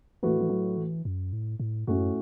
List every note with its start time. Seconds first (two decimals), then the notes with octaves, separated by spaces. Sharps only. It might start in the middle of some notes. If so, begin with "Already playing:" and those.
0.23 A2 E3 A3 F#4 B4
0.41 E3
0.49 F#3
0.77 E3
1.05 F#2
1.33 A2
1.60 A2
1.87 F#2 A2 A3 C#4 F#4